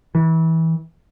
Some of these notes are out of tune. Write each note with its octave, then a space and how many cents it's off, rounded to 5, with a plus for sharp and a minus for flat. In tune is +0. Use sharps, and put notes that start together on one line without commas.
E3 -25